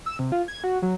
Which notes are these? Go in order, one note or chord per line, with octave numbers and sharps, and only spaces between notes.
E6
C3
F4
G#6
F#4
F#3